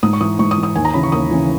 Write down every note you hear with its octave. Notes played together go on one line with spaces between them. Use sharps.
G#2 D#6
C#6
E3 D#6
G#2 C#6
D#6
E3
D#6
D#2 G#5
A#5
C#3 E3 B5
C#6
D#2 D#6
C#3 E3